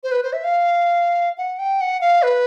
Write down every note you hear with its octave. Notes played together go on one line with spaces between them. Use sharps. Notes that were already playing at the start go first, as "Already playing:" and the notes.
C5
B4
C5
E5
F5
F#5
G5
F#5
F5
B4